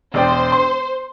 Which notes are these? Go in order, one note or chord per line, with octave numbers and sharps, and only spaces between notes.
E1 C5 D5 G5
C6